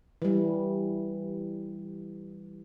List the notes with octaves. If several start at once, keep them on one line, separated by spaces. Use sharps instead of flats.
E3 G3